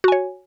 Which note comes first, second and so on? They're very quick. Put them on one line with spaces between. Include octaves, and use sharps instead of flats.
F#4 G#5 C#5